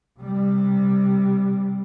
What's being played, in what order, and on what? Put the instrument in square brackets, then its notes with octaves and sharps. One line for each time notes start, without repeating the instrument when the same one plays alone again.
[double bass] C3 G3